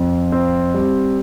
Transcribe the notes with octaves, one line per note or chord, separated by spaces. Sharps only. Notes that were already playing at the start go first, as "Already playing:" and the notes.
Already playing: F2
C4
G3